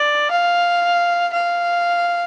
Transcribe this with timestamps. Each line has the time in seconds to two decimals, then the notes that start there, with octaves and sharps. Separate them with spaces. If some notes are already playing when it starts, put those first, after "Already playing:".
Already playing: D5
0.31 F5
1.33 F5